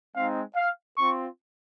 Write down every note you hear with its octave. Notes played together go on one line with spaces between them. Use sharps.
G#3 C4 D#4 F5
F5
C4 F4 C#6